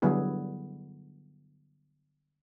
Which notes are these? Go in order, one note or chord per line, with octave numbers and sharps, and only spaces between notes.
D3 F#3 G3 B3 E4 G#4